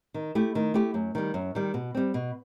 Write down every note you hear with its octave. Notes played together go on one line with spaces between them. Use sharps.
D#3
A3 E4 G4
D#3
A3 E4 G4
F#2
D#3 G3
F#2
D#3 G3
B2
G3 C4
B2